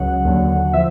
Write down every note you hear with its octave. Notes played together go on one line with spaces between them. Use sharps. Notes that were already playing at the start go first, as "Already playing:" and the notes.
Already playing: C#2 C#3 F#3 F#5
D#2 D3 F#3
F3 E5